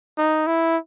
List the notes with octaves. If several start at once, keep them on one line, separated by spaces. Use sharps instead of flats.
D#4
E4